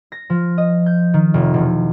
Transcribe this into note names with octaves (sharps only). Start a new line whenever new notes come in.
A#6
F3
D#5
G6
D#3
F1
E1